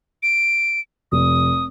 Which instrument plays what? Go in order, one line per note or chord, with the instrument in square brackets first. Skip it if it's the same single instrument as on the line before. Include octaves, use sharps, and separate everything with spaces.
[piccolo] D7
[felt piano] F1 [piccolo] D#6